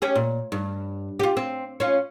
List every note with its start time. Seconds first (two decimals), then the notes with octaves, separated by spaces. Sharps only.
0.02 C#4 G4 G#4
0.15 A#2
0.52 G2
1.20 F4 G4
1.37 C4
1.80 C#4 F4